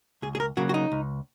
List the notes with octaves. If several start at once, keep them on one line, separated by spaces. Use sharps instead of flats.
C#2 G#4
G#4
A#4
C#3 F#3 A#3 F#4
F#4
D#4
C#2